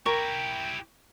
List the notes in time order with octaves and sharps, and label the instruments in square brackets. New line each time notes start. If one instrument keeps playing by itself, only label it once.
[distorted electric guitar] E4 G4 [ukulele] A#4 [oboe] G5 [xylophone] C#6